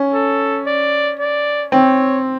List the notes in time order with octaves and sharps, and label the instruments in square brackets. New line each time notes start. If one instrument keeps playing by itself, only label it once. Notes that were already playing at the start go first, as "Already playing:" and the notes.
Already playing: [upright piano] C#4
[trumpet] A4
D5
D5
[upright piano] C4 [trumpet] C#5